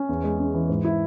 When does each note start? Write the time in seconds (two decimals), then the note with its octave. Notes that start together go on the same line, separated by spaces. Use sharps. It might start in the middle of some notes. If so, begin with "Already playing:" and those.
Already playing: C#4
0.09 E2
0.24 G#3
0.39 C#4
0.54 E3
0.69 G#2
0.85 E4